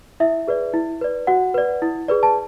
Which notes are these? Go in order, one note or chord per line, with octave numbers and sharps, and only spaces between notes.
E4 E5
G#4 B4 D5
E4
B4 D5
F#4 F#5
B4 D5
E4
G#4 B4 D5
A5